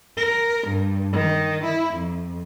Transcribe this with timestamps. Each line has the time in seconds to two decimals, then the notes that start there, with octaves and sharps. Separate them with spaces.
0.17 A#4
0.67 G2
1.12 D#3
1.64 E4
1.94 F2